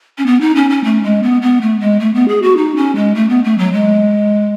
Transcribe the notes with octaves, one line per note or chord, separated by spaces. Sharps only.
C#4
B3
D#4
C#4
C#4
A3
G#3
B3
B3
A3
G#3
A3
B3
G#4
F#4
D#4
C#4
G#3
A3
B3
A3
F#3
G#3